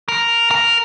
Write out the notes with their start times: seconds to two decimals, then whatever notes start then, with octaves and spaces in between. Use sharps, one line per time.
0.09 A#4
0.51 A#4